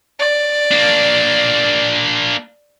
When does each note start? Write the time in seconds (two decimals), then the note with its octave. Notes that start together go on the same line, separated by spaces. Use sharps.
0.19 D5
0.71 A#3 D4